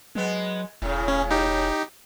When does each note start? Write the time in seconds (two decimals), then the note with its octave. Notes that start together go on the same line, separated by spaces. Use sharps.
0.15 F#3 G#3 B3
0.82 E1 A2 C#3
1.08 C#4
1.31 D#4 G4